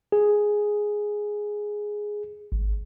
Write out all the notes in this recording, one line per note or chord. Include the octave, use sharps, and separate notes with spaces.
G#4
G#1